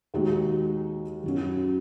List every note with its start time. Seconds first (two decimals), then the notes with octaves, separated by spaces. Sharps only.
0.14 D#2 D#3 G#3 D#4 F#4
1.24 F#2 F#3 C#4